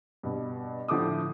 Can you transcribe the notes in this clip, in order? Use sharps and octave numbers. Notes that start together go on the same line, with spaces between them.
G2 B2
A2 D3 F3 A3 D6 D#6